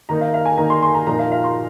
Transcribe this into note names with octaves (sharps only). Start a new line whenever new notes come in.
D#3 A#3 D#4 A#5
F5
F5
G#5
D#3 A#3 D#4 A#5
C6
C6
A#5
A#2 F3 A#3 D#4 A#5
F5
F5
C6